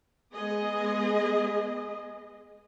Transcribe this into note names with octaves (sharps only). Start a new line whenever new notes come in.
G#3 B3 G#4 D#5